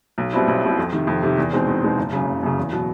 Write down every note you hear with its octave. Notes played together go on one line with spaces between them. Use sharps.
B1
B2 G3 C4 E4
B1
B2 G3 C4 E4
F2
C3 D#3
F2
C3 D#3
E2
B2 G#3 C4 D#4
E2
B2 G#3 C4 D#4
F#1
F#2 C#3
F#1
F#2 C#3
E2
B2 F#3